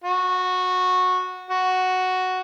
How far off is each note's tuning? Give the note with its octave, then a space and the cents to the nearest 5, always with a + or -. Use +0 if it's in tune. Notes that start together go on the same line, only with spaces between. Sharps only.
F#4 -15
F#4 +0